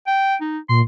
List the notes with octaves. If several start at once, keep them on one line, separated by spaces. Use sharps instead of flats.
G5
D#4
A#2 C6